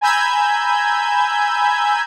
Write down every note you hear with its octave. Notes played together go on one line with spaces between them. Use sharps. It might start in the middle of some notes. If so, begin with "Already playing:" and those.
G#5 A#5 B5 E6 G6 G#6